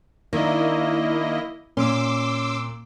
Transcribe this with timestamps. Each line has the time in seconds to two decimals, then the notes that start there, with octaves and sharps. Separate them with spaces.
0.33 D#3 A#3 D4 E4 D#5
1.77 A#2 C#4 C6 D6 E6